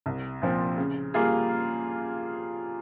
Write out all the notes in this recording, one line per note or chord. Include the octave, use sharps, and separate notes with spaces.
C2
A#2 F3 C4
C#3
G3 A#3 F4 G#4